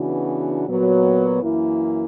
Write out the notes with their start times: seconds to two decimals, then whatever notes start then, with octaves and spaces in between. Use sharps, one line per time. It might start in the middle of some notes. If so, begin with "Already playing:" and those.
Already playing: C#3 E3 B3 D4 F#4
0.67 A#2 F#3 B3
1.43 F#2 E3 A#3 E4